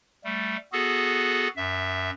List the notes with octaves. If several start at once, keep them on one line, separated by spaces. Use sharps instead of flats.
G3 A3
B3 F#4 G#4 A4
F#2 E5